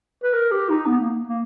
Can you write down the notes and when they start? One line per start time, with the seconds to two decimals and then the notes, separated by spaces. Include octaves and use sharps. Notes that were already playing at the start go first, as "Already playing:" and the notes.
0.23 B4
0.33 A#4
0.51 G4
0.69 D#4
0.87 B3
1.00 A#3
1.28 A#3